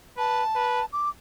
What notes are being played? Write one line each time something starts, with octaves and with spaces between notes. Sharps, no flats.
B4 A5
B4
D6